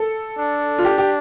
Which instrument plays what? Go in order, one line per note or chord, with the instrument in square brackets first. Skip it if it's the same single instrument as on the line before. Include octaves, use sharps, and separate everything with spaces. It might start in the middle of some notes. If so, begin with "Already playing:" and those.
Already playing: [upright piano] A4
[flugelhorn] D4
[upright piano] F4
G4
G4